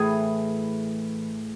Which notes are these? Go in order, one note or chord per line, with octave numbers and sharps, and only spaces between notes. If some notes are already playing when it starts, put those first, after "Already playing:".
Already playing: A2 E3 G#4